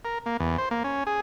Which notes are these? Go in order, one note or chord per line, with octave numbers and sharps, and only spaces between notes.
A#4
A#3
E2
C5
A#3
C#4
G#4